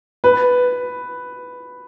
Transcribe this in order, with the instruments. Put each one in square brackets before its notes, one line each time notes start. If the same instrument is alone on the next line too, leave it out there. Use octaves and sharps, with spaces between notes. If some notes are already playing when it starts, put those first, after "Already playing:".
[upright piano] B4